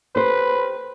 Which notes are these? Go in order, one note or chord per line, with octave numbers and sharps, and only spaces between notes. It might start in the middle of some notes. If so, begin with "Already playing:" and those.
G4 B4 C5